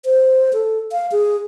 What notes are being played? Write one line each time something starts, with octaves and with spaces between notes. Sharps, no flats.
C5
A4
F5
G#4